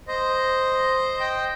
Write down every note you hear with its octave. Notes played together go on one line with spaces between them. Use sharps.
C5 D#5
D#5 G5